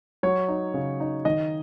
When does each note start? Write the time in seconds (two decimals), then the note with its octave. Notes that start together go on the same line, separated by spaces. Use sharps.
0.23 F#3 C#5
0.48 D#4
0.74 C#3
1.00 D#4
1.25 D#3 D#5